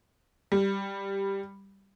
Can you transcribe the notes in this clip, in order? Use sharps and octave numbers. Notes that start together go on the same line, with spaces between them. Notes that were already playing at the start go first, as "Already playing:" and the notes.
G3